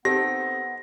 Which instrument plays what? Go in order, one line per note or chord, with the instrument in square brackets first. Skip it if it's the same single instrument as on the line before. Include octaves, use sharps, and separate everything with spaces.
[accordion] B3 [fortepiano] C4 D#4 A4 [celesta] G4 [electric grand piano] A#6